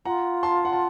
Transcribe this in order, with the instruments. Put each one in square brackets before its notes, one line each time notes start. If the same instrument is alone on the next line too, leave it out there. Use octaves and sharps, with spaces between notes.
[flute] F4 [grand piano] F#5 A#5
[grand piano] A5 C6
F#5
A5